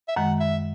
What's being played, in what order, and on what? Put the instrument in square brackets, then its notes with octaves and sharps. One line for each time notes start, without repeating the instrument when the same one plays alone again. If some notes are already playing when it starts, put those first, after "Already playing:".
[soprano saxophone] E5
[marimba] F#2 D#3 G#3 [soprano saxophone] F#5
[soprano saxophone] E5